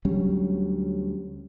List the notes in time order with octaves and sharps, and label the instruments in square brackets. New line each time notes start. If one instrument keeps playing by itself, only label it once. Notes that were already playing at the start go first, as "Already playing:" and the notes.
[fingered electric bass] D2 F#3 G3 C#4